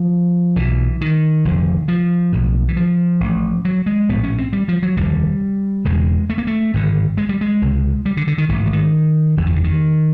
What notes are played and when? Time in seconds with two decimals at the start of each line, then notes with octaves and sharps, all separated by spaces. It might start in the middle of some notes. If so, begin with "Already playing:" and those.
Already playing: F3
0.56 B1 B2 E3
1.01 D#3
1.45 F1 F2 D3
1.88 F3
2.32 B1 A2
2.68 E3
2.76 F3
3.20 A1 A2
3.65 F#3
3.86 G#3
4.09 A#1 A2 B3
4.23 C#4
4.38 C4
4.53 G3
4.68 F3
4.83 F#3
4.96 F1 D#2 D3 G3
5.85 E1 E2 C#3 G#3
6.30 A3
6.38 A#3
6.47 A3
6.74 G#1 G2 D3
7.17 G#3
7.29 G3
7.41 G#3
7.62 C#2 C3
8.06 G3
8.17 D3
8.27 D3
8.38 D#3
8.49 A1 G#2 E3
8.58 D#3
8.66 D3
8.73 D#3
9.37 F#1 E2 C#3 E3
9.46 D#3
9.56 D3
9.64 D#3